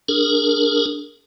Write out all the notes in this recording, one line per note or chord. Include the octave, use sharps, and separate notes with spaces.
D4 G#4 A#4